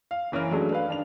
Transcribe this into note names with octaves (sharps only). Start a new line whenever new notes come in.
F5
F#1 E3 C#4 A#4 F6
F#3 G#3 A3 C#4 D4 G#4
D4 B4 F5
D#3 D4 F7